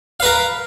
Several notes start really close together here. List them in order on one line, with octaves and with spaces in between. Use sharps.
F5 B4 A#4